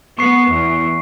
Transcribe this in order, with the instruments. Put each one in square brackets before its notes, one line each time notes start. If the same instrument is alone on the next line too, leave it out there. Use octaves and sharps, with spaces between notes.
[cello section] B3 [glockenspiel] C#6 C7
[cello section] E2